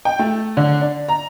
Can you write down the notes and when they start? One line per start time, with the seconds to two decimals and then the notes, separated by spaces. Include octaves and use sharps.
0.05 G5
0.19 A3
0.57 D3
0.81 D4
1.09 A#5